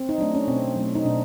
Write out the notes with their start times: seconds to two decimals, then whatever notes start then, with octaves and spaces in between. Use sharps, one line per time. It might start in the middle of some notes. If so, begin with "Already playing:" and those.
Already playing: C4
0.09 D#4
0.18 F#3 A3 D4
0.35 C#4
0.47 B2 C4
0.76 F#3 A3
0.95 D#4
1.05 B2 D4